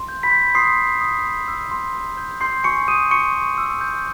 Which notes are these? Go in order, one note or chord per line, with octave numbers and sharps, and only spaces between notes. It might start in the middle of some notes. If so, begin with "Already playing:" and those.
Already playing: C6
G6
B5 B6
G6
C6 D#6 C7
C6
D#6
C6
E6
C6
C6
G6
C6 G6 C7
G#5 C#6 C#7
D#6 G6 D#7
C6 C#6 C#7
C#6
E6
G6